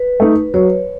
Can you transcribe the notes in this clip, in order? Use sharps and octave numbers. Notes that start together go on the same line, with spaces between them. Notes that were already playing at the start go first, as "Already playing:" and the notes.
Already playing: B4
A3 D#4
F#3 C#5